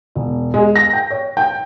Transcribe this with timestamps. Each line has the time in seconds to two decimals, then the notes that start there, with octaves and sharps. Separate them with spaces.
0.15 E1
0.54 G#3
0.76 A#6
0.93 G5
1.11 C#5
1.37 G5